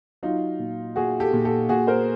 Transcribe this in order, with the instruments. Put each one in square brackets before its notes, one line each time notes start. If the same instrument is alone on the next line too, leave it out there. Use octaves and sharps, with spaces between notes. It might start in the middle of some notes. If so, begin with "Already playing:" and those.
[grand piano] F#3 D#4 F4
A#2
A#2 F#4 G#4
G4 A4
A#2
G4 A4
A#2 F#4 G#4
A#4 C5